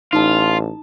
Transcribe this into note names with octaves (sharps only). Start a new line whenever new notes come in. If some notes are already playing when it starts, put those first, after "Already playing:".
A1 D#4 F4 A5